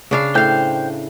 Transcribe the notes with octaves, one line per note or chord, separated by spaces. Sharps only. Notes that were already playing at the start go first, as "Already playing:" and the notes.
C#3 D4 F5
A2 C5 F5 G5 G6